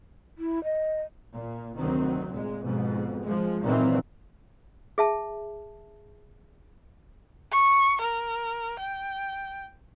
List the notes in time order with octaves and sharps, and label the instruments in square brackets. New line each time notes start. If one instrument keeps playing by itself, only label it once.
[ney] E4
D#5
[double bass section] A#2
F1 D2 D#3 F#3 C4
A#2 G#3
F2 G#2 B2
F3 G#3
G#1 A#2 D#3 E3 F#3 C4
[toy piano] G#4 E5 A5
[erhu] C#6
A#4
G5